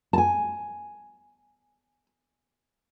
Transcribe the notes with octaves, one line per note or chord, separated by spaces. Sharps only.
G#5 A5